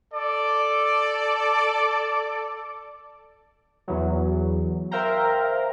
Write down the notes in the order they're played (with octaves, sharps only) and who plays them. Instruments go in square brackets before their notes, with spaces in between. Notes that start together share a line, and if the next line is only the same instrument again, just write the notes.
[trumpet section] A4 D5 D6
[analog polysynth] E2 E3 F#3
A#4 C5 E5 F5 G5 A#5